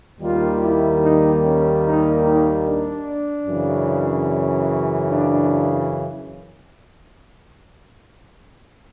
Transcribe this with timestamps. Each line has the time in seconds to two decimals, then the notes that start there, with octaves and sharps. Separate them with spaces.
0.20 D#2 D#3 G3 A#3 F4
0.61 E4
1.01 D#4
1.42 C#4
1.84 D#4
2.24 D#4
2.65 D4
3.47 F#2 C#3 E3
5.09 D4